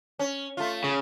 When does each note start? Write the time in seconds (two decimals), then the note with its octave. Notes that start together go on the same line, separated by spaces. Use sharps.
0.19 C#4
0.57 A3 F4
0.84 C#3